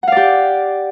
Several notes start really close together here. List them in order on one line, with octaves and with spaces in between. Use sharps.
F#5 F5 D5 G4